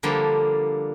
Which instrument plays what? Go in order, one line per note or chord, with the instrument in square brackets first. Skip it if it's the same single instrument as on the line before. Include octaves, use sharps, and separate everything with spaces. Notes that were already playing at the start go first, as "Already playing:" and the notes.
[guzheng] D3 F3 G3 A#3 A4